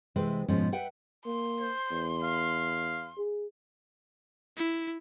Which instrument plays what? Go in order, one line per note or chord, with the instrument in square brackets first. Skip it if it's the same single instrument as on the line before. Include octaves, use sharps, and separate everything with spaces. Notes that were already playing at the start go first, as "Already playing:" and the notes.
[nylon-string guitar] C3 E3 G#3 B4 C5
G#2 B2 F3 G#3 C#4
B4 E5 F#5 G5
[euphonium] A#3 [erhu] C6
[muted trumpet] C5
[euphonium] E2
[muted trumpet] F5
[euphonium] G#4
[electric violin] E4